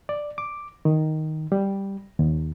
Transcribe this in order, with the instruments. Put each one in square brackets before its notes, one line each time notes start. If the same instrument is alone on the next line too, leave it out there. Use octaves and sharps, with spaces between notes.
[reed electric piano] D5
D6
D#3
G3
D#2